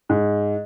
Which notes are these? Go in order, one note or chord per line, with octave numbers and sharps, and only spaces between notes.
G#2